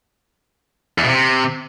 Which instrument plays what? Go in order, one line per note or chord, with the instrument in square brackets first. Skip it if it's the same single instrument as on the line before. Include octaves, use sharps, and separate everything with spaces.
[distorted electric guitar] E2
B2
C3